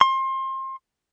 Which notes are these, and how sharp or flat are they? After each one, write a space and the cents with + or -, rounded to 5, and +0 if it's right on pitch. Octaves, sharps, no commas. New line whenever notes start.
C6 +30